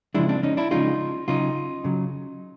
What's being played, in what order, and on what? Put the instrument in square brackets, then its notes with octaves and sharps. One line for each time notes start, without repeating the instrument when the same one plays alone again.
[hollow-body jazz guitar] C#3 F3 G#3 D4 E4
C4 D4
C#4 D#4
D4 E4
C#3 F3 G#3 D#4 F4
C#3 F#3 D#4 F4
C#3 F#3